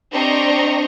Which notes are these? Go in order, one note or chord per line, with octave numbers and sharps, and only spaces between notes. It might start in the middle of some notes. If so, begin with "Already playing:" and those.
C4 D4 G4 D#5 A#5 C#6